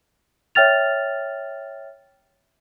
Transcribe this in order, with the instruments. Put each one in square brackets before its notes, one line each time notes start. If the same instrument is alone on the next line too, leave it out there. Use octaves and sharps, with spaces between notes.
[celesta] C#5 E5 G5 F6 A6 F7